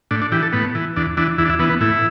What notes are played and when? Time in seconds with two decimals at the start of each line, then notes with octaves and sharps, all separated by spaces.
0.11 A2 D4
0.22 D4
0.32 E3 G4
0.43 A4
0.53 A2 B3
0.75 E3
0.96 E2 D4
1.17 E3 D4
1.38 E2 E4
1.45 D4
1.50 E4
1.59 E3 B3
1.70 B3
1.81 A2 E4